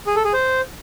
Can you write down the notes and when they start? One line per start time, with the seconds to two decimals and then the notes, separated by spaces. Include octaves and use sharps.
0.07 G#4
0.16 A4
0.24 G#4
0.33 C5